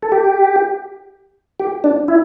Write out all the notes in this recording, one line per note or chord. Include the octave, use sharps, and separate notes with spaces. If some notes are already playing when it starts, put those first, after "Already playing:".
A4
G4
G4
D4
E4